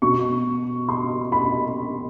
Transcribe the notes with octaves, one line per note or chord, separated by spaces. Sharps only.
B2 C#6
C6
B5